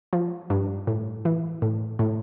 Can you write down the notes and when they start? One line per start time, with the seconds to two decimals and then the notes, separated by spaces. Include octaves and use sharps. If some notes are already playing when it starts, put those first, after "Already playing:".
0.13 F3
0.50 G2
0.87 A2
1.25 E3
1.62 A2
1.99 A2